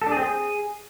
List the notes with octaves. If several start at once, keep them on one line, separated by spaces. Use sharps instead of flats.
A4
D4
G#4
C4
G#4